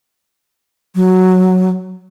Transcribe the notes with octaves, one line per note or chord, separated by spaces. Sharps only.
F#3